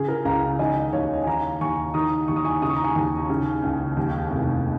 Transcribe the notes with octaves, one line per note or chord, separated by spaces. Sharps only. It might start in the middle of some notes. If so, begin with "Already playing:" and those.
Already playing: C#3 G#4
A#4
C#2 F5 A#5
D#3 D#5 G#5
D#2 C#5 F5
G#5
D#3 F5 A#5
D#2 G#5 C#6
D#3 A#5 D#6
D#2 C#6
D#6
G#5 C#6
C#3 D#6
C#6
A#5
G#5 C#6
D#2
C#3
C#2
D#2
F1